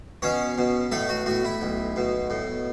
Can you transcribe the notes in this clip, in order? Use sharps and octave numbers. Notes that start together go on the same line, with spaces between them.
B2 C#4 C#5
B2
A2 A3 A4
F#4
A2 F#4
E4
B1
B2
A2